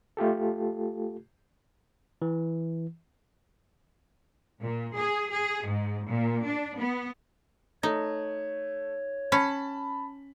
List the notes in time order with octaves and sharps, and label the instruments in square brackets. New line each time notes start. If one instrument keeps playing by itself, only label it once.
[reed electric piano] A3 F4 G4 A4
[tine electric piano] E3
[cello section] A#2
G#4
G#4
G#2
A#2
D4
B3
[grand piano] A3 [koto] D#4 [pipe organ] C#5
[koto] C#4 [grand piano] A5 B5 B6